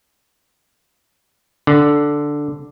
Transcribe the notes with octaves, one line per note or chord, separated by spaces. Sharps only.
D3